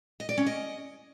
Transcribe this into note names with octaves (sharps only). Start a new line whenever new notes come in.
D#5
D5
C#4
D#5